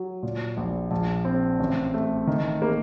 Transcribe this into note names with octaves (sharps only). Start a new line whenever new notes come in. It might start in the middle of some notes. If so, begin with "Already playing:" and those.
Already playing: F#3
A#2
A#1
A#1
C4
A1
A3
D#3
A#3